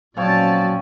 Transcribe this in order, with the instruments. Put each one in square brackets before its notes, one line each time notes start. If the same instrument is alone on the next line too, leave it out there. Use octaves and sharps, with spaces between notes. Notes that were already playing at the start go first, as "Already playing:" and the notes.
[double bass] A#2 C#4 [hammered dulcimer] F3 C4 C#5 [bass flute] F#3 [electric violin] D5 A5